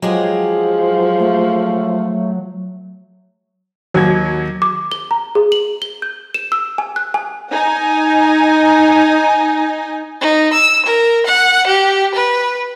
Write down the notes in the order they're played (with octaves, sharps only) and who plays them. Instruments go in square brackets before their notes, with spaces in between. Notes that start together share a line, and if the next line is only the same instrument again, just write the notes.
[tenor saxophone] F3 [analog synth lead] F#3 [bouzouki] G#3 G4 G#4
[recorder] A3
[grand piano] D#2 [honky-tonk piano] F#3 G#6
[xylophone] D6
G7
A#5
G#4
F#7
G7
G6
E7
E6
G#5
F#6
G#5
[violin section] D#4 G#5
[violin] D#4
E6
A#4
F#5
G4
B4